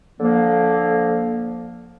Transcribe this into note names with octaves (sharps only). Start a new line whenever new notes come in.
D3 F3 A#3